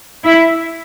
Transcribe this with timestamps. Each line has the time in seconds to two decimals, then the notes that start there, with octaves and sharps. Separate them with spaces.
0.24 E4